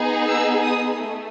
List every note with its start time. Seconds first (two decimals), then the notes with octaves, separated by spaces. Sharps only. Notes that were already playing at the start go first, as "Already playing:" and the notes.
Already playing: B3 D#4 G#4
0.27 E6
0.64 D#6
1.00 A3